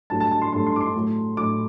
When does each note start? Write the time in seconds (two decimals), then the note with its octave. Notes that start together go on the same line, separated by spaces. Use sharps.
0.10 G2 F#3 A3 A5
0.20 A5
0.31 A5
0.42 C6
0.53 G2 F#3 A3 C6
0.66 C6
0.76 D6
0.81 C6
0.95 A2 F#3 A3
1.37 A2 F#3 A3 D6